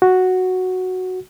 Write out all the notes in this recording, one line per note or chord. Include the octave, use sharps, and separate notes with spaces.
F#4